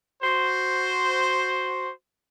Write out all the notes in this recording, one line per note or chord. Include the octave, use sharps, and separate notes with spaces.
F#4 C5